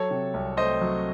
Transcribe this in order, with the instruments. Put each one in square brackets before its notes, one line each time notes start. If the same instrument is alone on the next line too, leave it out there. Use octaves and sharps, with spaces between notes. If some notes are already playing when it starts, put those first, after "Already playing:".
Already playing: [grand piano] F#3 A4 C#5
C3
C2
A3 C5 D#5
F#3